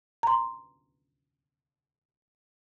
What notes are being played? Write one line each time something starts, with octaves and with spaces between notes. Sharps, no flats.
A#5 C6